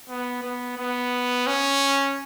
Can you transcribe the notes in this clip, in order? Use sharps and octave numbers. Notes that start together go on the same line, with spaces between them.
B3
B3
B3
C#4